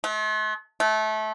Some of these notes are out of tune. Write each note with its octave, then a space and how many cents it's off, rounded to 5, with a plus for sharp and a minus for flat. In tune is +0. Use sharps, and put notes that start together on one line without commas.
A3 -45
A3 -25